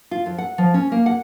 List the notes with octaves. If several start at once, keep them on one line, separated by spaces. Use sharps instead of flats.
F4
F2
F#5
F3
C#4
A#3
F#5